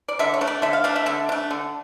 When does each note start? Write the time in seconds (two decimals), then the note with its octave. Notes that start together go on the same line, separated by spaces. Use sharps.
0.08 D5
0.19 D3 E5
0.34 C#5
0.41 A3 D4
0.47 D5
0.62 D3 E5
0.73 F5
0.84 A3 D4 F5
0.96 E5
1.06 D3 E5
1.29 A3 D4
1.51 D3